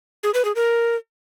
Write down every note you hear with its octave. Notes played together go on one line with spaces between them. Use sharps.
G#4
B4
G#4
A#4